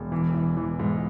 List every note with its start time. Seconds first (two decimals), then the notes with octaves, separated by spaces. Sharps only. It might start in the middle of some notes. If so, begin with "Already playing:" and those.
Already playing: E1
0.12 E3
0.34 E3
0.57 E3
0.80 G#2